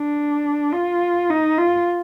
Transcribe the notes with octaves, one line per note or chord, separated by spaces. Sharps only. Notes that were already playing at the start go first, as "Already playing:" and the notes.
Already playing: D4
F4
D#4
F4